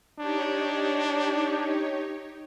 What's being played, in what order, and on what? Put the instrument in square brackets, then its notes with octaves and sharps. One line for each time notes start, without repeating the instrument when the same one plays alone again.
[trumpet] D4 [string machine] D#4 G4 C#5